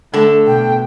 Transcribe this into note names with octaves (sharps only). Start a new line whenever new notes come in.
D3 A3 A4
B2 G5